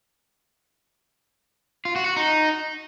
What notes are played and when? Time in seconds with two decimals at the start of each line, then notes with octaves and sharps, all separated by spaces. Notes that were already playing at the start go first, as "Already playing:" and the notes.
1.85 F4
1.96 F#4
2.06 F#4
2.16 D#4